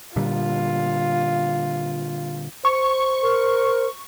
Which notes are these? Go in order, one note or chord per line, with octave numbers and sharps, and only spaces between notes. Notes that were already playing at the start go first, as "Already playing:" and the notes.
A#2 D3 G3 F4
C5 C#6
A#4